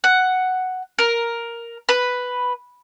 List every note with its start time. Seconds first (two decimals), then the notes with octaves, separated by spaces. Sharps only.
0.04 F#5
0.99 A#4
1.89 B4